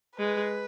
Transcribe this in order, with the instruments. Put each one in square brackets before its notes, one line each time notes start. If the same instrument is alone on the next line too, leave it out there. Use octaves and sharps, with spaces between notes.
[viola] G#3 [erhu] B4